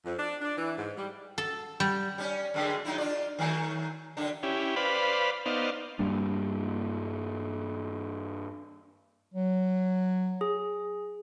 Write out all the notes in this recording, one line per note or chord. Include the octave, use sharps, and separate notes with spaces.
F2
D4
D4
E3
G#2
G3
A4
G3
G3 C#4
F#2 D3 G#3
F#3 D#4 E4
D4 F4 D5
D#3 F#3 A3
F#2 D3 D4
C#4 E4 G4
B4 C5 D5 F5 B5
B3 D#4 C5 D5 F5
G2 G3 A#3 D4
F#3
G#4